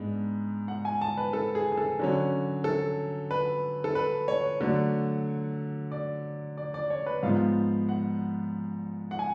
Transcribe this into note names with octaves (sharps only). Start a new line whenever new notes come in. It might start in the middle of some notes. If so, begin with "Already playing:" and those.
Already playing: G#2 G#3 B3 D4
F#5
G#5
A5
B4
A4
G#4
G#4
A4
D3 F#3 C#4
A4
B4
A4
B4
C#5
D3 F#3 A3
D5
D5
D5
C#5
B4
G#2 F3 B3 F5
F#5
F#5
G#5